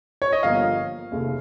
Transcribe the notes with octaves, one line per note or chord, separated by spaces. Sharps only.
C#5
D#5
G1 G2 F3 A#3 F5
F1 D#2 C#3